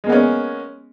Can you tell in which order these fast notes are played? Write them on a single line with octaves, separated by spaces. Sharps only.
G#3 A#3 B3 C#4